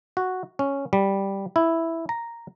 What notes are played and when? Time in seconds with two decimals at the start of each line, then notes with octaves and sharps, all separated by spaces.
0.17 F#4
0.59 C#4
0.93 G3
1.56 E4
2.09 A#5